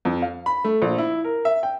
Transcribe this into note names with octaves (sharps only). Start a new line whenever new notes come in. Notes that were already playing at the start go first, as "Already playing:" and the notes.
F2
F5
B5
A3
A#1
E4
A#4
E5
G5